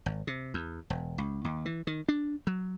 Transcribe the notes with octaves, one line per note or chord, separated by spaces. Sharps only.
G#1
C3
E2
E1
C#2
D#2
E3
D#3
D4
F#3